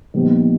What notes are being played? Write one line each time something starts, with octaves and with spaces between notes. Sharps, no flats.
A#1 A#2 G3 B3 D#4